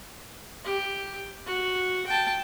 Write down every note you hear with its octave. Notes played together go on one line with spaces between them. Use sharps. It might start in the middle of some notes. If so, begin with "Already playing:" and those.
G4
F#4
G5 A5